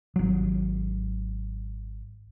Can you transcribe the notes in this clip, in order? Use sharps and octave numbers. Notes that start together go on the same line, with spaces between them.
G#1 F#3